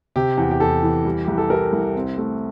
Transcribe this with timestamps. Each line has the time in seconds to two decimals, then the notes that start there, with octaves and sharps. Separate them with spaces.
0.16 C3 G4
0.37 E2
0.51 G4
0.60 E2 A4
0.83 E3
1.05 G3
1.24 C2 G4
1.38 A4
1.50 G3 A#4
1.73 C2
1.96 C4
2.18 A3